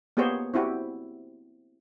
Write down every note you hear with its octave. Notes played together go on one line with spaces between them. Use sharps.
A#3 B3 G4 G#4 C5 C#5
C4 E4 F#4 G4